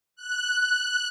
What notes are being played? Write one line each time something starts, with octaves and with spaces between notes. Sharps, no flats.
F#6